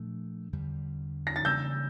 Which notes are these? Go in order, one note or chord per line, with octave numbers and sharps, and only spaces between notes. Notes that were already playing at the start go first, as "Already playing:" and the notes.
Already playing: A#2 F3 A3 D4
E2 D3 G3
A#6
A6
C#3 E3 G3 A#3 E6 G6